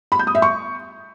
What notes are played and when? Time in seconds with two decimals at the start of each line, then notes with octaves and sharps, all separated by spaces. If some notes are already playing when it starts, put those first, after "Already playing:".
0.12 B5
0.19 G6
0.27 D#6
0.35 E5
0.42 C#6